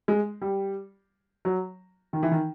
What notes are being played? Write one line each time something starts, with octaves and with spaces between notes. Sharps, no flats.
G#3
G3
F#3
D#3
E3
D#3